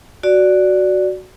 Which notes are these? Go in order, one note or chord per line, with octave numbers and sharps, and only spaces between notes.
F#4 D5